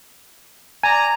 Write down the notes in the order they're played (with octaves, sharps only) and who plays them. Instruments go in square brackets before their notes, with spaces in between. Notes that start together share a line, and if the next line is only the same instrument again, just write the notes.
[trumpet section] D5 A#5 [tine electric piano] G#5